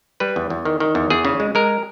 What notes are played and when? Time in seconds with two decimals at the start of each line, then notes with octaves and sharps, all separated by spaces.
0.20 G3 B4
0.36 E2
0.50 E2
0.65 D#3
0.80 D#3
0.95 E2
1.10 E2 G#4
1.25 C#3
1.40 G#3
1.55 G#3 A#4